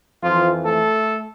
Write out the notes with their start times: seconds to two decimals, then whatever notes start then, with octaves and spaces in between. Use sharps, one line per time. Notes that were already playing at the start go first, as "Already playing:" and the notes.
0.22 F2 E3 F3 F4
0.65 A3 A4